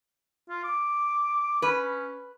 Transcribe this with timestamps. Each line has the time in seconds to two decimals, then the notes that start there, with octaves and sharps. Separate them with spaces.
0.49 F4
0.64 D6
1.62 C#4 B4